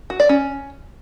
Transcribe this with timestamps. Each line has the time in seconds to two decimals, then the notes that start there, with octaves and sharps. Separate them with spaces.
0.10 F#4
0.20 D5
0.29 C#4